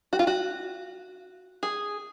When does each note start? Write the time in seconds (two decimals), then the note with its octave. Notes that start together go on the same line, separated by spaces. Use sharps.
0.13 F#4
0.19 F4
0.27 F#4
1.63 G#4